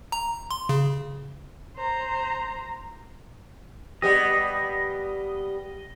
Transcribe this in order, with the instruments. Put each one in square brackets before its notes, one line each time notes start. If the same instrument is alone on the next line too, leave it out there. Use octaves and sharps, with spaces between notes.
[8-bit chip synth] A#5
C6
C#3
[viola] C5 A#5
[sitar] G3 B3 G4 [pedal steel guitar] D#5